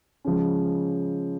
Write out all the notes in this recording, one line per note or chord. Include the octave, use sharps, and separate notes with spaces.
C#3 F3 G#3 C#4